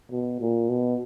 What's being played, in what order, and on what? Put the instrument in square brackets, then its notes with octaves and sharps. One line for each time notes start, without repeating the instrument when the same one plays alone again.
[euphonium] B2
A#2
B2